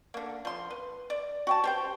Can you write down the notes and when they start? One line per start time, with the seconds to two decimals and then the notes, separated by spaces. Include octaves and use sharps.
0.14 D3 A#3
0.45 F3 C6
0.71 B4
1.10 D5
1.47 F#4 G5 A5
1.64 G4 C5 G5